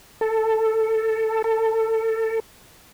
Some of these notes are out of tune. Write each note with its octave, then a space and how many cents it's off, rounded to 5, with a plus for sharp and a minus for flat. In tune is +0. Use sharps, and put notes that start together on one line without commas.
A4 +10
A4 +25